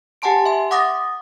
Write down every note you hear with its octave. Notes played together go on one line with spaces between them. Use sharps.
G4 F#5 G#5 A5 C6 D7
E5 C6
F#5 D6 D#6 A6 A#6